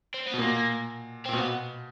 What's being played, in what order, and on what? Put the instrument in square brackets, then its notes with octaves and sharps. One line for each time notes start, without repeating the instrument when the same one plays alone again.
[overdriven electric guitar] C4
B3
[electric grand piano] B2
[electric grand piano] A#2 [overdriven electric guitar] A#3
[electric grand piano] A#2 [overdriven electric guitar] C4
[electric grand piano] B2
[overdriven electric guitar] B3